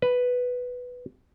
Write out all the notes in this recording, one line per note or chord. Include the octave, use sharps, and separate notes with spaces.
B4